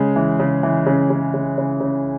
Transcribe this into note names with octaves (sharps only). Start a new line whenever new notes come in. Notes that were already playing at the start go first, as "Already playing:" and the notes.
Already playing: C#3 G#3
E3
C#3
E3
C#3
C#3
C#3
C#3
C#3